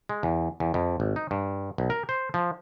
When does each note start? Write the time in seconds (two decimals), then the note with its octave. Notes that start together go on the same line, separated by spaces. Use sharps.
0.09 G#3
0.23 E2
0.60 E2
0.74 F2
1.00 G#1
1.16 D#4
1.31 G2
1.78 B1
1.90 A#4
2.09 C5
2.34 F3